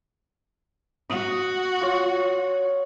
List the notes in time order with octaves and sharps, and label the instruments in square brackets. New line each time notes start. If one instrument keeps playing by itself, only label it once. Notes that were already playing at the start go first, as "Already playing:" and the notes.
[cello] F#4 [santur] D#6
[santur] F4 C#5